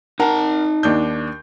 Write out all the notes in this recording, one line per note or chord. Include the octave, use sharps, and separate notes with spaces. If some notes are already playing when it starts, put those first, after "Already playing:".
D#4 A#4 F#5 A5
D#2 D4 G6